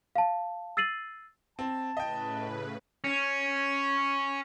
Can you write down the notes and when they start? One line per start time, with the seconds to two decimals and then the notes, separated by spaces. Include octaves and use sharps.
0.16 F5 A5
0.77 E6 A6 C7 D#7 F#7
1.59 C4 A5
1.97 A2 C#3 B4 D#5 G5
3.04 C#4